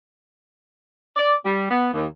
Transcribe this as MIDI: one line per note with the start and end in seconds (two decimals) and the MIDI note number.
1.16 1.34 74
1.45 1.67 55
1.71 1.89 59
1.94 2.06 39